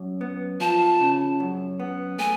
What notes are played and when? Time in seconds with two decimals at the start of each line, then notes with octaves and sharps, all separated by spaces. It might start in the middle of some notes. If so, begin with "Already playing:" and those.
Already playing: F#2
0.21 B3
0.60 F3 A5
1.00 C#3
1.40 F#2
1.80 B3
2.19 A3 G#5